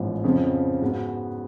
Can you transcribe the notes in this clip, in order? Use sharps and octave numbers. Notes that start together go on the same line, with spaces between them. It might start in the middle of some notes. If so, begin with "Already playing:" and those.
Already playing: A1 G#2 F3 B3
F2 C#3 F3 B3
G#2 G#3 B3 F#4